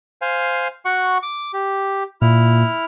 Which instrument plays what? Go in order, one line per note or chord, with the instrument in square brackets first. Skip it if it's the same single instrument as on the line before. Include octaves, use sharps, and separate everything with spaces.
[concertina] C5 F5 G#5
F#4 F#5 C#6
D6
G4
[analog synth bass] A#2 [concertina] E4 F6